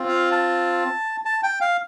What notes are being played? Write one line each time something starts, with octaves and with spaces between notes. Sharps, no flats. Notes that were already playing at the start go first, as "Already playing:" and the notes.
Already playing: C4 F4
F5
A5
A5
G5
F5